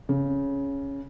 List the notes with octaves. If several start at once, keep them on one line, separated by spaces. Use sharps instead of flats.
C#3